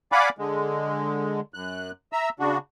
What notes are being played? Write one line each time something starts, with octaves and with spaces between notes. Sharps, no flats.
D5 F5 F#5 G#5 B5 D6
D3 G#3
F#2 F#6
E5 A#5 E6
C#3 D4 F#4